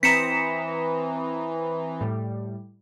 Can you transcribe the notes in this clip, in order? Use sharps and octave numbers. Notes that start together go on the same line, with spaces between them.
E3 C4 A#5 D#6 B6 C#7 E7
A2 G3